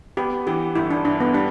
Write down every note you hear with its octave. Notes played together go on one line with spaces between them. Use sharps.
B3 G4
E3 G4
G1 E4
D4
G2 D4
B3
G3 D4